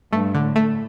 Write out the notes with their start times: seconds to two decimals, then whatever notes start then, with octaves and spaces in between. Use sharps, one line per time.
0.12 G2 A3
0.35 D3
0.45 A2
0.56 A3